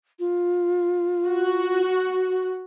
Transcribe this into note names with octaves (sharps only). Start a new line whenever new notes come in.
F4
F#4